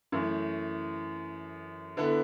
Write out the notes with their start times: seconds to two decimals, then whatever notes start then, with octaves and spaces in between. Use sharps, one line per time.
0.12 F#2 E3 A3
1.97 D3 B3 E4 A4